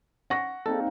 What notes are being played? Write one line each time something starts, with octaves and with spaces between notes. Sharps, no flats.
F#5 C#6 A#6
A#3 C4 D#4 A4